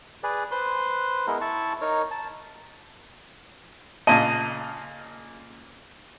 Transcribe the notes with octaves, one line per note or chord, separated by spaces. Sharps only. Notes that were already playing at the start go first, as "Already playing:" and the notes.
G#4 B4 D5
B4 C5 C6
G#3 B3 E4 A#4
E4 A5 C#6
D#4 A#4 C#5
A5
A#2 C#3 D#5 A5